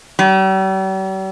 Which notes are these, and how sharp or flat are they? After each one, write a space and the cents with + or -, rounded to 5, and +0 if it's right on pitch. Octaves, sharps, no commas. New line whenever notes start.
G3 -45